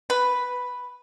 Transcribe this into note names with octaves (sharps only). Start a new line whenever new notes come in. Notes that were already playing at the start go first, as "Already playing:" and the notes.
B4